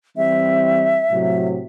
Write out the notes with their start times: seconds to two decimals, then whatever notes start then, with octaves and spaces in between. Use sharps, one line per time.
0.17 E3 G3 C4 E5
1.11 A2 C3 F#3